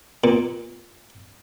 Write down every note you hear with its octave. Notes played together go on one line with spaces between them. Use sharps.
A#2